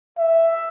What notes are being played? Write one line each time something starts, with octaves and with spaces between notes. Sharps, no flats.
E5